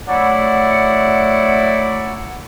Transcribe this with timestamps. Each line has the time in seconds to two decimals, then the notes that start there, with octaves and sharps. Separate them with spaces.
0.08 F#3 A3 E4 D5 F#5